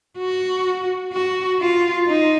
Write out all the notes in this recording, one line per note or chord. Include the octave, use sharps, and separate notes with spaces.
F#4
F#4
F4
D#4